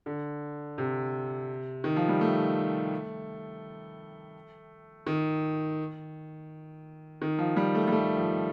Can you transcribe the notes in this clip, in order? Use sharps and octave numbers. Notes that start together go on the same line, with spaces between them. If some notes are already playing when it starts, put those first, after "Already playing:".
D3
C3
D#3
F3
G3
A3
D#3
D#3
F3
G3
A3
G3
A3
F3